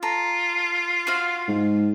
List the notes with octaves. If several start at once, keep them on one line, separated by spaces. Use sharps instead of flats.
F4 A4 A#5
F#4 C5 F5
G#2